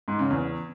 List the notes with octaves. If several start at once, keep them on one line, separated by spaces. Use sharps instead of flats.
G#2
C#3
E2